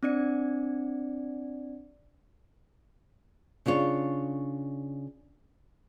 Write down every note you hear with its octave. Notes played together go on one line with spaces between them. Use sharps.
C4 D4 D5 C#7
C#3 D4 F4 C#5